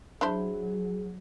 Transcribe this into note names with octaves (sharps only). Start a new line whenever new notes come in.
F#3 D4 E4 G#4 C5